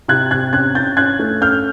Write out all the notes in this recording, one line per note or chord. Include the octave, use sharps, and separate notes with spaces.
C3 F#6 G#6
C3 F#6 G#6
C#4 F#6 G#6
C#4 G6 A6
C#4 F#6 G#6
A3
C#4 F6 G6